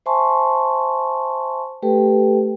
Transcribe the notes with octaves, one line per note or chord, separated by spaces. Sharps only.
C5 E5 G#5 A5 C6 C#6
A3 G4 A4 B4 G5